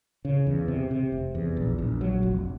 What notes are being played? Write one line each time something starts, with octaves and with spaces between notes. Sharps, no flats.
C#3
E2
C3
C3
F1
E2
A#1
A#1
F#3
F1